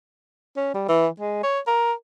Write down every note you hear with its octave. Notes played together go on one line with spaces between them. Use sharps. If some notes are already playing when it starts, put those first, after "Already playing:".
C#4
G3
E3
G#3
C#5
A#4